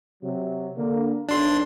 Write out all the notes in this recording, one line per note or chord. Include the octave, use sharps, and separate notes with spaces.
C3 F#3
D3 A#3
B1 D4 C6